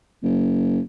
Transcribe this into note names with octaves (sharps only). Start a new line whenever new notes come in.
F#1